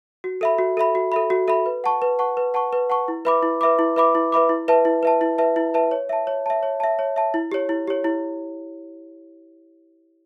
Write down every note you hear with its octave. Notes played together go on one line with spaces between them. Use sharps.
F#4
A4 E5 B5
F#4
A4 E5 B5
F#4
A4 E5 B5
F#4
A4 E5 B5
B4
F#5 A5 C#6
B4
F#5 A5 C#6
B4
F#5 A5 C#6
B4
F#5 A5 C#6
E4
B4 E5 B5 D6
E4
B4 E5 B5 D6
E4
B4 E5 B5 D6
E4
B4 E5 B5 D6
E4
B4 E5 A5
E4
B4 E5 A5
E4
B4 E5 A5
E4
B4 E5 A5
C#5
E5 A5
C#5
E5 A5
C#5
E5 A5
C#5
E5 A5
E4
G4 C#5
E4
G4 C#5
E4